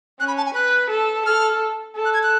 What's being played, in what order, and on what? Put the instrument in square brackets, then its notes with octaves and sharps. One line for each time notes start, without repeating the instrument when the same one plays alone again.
[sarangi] C#4 [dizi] F#6
[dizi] B5
A5
G#5
[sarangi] B4 [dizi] F#6
[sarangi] A4
[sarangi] A4 [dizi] F6
[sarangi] A4
[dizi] F#6
G#6
F#6